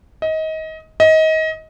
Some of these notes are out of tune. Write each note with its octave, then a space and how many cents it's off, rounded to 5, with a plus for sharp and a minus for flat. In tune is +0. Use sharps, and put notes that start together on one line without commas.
D#5 +25
D#5 +25